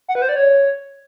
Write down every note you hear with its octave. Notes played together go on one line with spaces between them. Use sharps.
F#5
B4
C5
D5
C#5